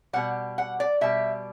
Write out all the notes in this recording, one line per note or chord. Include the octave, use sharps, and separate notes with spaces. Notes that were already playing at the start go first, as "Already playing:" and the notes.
B2 G3 F#5
F#5
D5
B2 G3 E5